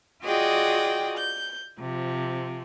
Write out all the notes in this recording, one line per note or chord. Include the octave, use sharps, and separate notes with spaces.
F4 F#4 G#4 D5 D#5 G5
G6
C3 F3